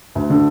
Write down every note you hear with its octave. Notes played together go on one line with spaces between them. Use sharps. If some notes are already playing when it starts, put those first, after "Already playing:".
D2
D3